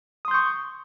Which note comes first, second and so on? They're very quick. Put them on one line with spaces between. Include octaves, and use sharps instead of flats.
D#6 C6 G6 C#6